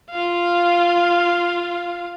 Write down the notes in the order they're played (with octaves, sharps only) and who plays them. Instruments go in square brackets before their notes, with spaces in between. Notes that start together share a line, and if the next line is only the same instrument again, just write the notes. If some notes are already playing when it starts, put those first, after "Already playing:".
[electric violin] F4 F5